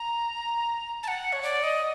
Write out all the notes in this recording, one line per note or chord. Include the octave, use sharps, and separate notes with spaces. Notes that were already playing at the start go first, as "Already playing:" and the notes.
Already playing: A#5
A5
F#5
C#5
D5
D#5